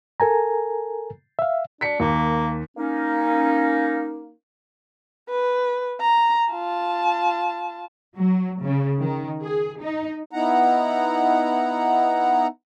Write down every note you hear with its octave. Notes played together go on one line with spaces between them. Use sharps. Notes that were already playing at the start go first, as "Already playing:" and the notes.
A4 A#4 G#5 A#5
E5 F5
D4 B6 C#7
D#2 A#3
A#3 C#4 D#4
B4
A#5
F4 A5
F#3
C#3
D#3
G#4
D#4
B3 D#4 E4 F#5 A#5